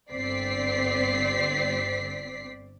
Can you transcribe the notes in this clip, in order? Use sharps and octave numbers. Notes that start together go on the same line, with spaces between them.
G1 C4 D5 B6 C7